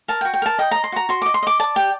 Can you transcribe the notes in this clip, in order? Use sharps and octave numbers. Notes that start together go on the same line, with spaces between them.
A#4 A5
G5
F#4
G5
A#4 A5
D#5 G5
D#5 A#5
C6
F#4 A#5
F#4 C6
D#5 D6
C6
D#5 D6
D5 A5
G4 G5